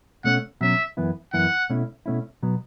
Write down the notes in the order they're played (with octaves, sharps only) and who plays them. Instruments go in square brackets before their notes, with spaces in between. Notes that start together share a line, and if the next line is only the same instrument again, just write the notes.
[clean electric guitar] B2 A3 C#4 [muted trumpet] F#5
[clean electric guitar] B2 F#3 C#4 [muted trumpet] E5
[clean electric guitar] F#2 E3 B3 E4
[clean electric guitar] F#2 E3 B3 E4 [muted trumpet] F#5
[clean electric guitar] B2 A3 C#4 E4
B2 A3 C#4 E4
B2 F#3 B3